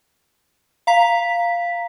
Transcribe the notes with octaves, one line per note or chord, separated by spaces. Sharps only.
F5 A#5 B6